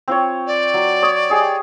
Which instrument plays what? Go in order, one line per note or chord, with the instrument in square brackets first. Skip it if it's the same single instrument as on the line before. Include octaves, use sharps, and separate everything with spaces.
[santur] C4 F4 C#5
[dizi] D5
[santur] F#3
C#5 D#6
G4 G#4 D#5